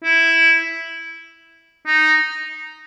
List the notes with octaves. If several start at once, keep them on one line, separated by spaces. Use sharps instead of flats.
E4
D#4